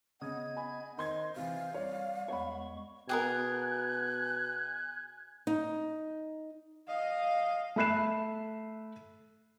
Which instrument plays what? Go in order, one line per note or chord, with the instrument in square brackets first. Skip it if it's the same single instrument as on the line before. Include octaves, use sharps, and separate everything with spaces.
[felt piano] C#3 D#6 [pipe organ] B3 G#6 [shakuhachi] D#5
[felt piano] G#5 B5
[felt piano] D#3 C6 G#6 [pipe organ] C5 [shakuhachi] D#5
[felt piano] C3 E3 [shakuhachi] F5
[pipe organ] G3 [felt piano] C#5 D5
[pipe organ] E2 G#3 C#6 [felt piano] C#5 F#5 B5
[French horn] B2 [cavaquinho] G4 G#4 A#4 [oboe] G#5 [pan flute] F#6
[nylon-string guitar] D#4
[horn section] D#5 [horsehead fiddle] F5
[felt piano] A3 E5 B5 F#6 C7 E7